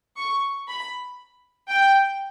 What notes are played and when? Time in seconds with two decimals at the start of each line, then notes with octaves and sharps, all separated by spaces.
0.17 C#6
0.68 B5
1.69 G5